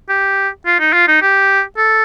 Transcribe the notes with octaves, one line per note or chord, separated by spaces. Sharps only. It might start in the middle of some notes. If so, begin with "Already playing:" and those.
G4
F4
D#4
F4
D#4
G4
A4